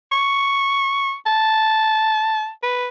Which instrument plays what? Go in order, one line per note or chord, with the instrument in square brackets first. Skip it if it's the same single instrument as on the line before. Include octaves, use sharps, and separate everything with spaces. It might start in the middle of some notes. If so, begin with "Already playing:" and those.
[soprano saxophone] C#6
A5
B4